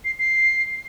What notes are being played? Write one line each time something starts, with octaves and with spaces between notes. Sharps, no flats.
C7
C7